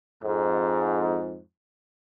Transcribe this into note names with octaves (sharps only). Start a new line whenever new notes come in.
F2 G#2